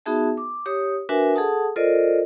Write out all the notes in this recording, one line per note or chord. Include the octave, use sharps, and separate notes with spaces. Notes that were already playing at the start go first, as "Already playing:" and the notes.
B3 D#4 F#4 G#4 E5 A5
D6
G4 C#5 D#6
D4 F#4 A#4 B4 E5 G#5
G#4 A4 F#5 A5 D#6
F4 A4 A#4 C5 D5 D#5